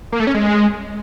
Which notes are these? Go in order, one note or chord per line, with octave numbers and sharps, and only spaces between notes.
A#3
A3
C#4
G#3